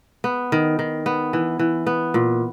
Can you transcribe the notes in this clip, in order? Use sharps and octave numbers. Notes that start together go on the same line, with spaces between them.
B3
D#3
D#3
B3
E3
E3
B3
A#2